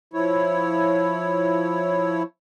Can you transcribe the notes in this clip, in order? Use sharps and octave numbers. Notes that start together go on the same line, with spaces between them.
F3 E4 C#5